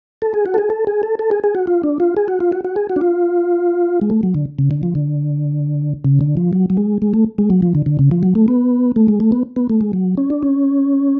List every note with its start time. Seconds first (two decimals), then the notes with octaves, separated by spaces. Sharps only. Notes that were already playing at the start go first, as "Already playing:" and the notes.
0.22 A4
0.34 G#4
0.46 F#4
0.54 A4
0.58 G#4
0.70 A4
0.87 G#4
1.03 A4
1.19 A4
1.31 G#4
1.44 G#4
1.55 F#4
1.67 F4
1.83 D4
2.00 F4
2.17 G#4
2.28 F#4
2.40 F4
2.52 F#4
2.65 F#4
2.76 G#4
2.89 F#4
2.96 D4
3.01 F4
4.01 G#3
4.10 A3
4.23 F#3
4.34 D3
4.59 C#3
4.71 D3
4.83 F3
4.95 D3
6.05 C#3
6.21 D3
6.37 F3
6.53 F#3
6.70 F#3
6.77 G#3
7.02 G#3
7.14 A3
7.38 G#3
7.50 F#3
7.62 F3
7.75 D3
7.86 D3
7.99 C#3
8.11 F3
8.23 F#3
8.35 A3
8.48 B3
8.96 A3
9.08 G#3
9.20 A3
9.32 B3
9.56 B3
9.69 A3
9.81 G#3
9.93 F#3
10.17 C#4
10.30 D4
10.43 C#4